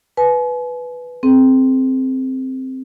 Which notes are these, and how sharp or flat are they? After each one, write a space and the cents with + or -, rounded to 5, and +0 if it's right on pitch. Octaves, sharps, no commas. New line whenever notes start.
B4 +0 G#5 +40
C4 +0 G#4 +35